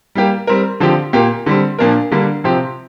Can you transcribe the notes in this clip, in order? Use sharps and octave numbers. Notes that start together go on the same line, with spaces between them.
G3 A#3 G4
G3 C4 A#4
D3 F3 C4 G4
A#2 A#3 G4
D3 G3 C4
A#2 F3 A#3 D4 A#4
D3 G3 A#3 D4
C3 F3 C4 G4